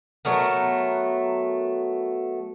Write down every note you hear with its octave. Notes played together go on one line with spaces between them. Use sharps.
F#3 A3 B3 A#4